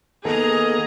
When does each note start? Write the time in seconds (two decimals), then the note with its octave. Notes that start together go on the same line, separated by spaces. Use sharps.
0.25 D#3 A#3 B3 G#4 A4 D#5 A#5